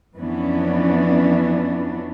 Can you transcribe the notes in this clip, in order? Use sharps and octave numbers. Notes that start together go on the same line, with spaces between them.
F2 E3 B3 C#4 D4